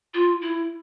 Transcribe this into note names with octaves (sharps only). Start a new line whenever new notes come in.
F4
E4